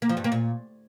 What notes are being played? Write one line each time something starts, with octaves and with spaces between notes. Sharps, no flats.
A#3
F3
G2
A#3
A#2